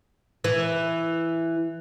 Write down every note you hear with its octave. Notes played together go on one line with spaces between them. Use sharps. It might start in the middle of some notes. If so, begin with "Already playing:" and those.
E3